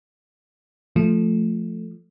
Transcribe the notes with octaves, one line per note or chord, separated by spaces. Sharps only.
F3 A3